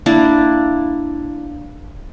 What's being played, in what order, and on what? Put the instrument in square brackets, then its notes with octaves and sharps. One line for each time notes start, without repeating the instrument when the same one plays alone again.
[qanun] A#3 D4 E4 D5